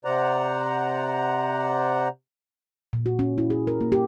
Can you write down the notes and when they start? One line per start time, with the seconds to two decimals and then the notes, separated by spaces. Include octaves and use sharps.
0.05 C3 C5 D5 F#5 A#5
2.93 A#2
3.06 F#4
3.19 C#4
3.38 E4
3.50 G#4
3.67 A#4
3.81 A#3
3.92 G4